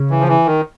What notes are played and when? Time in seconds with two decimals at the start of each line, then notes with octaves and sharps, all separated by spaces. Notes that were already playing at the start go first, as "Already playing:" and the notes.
Already playing: C#3
0.11 E3
0.20 F3
0.28 E3
0.46 D#3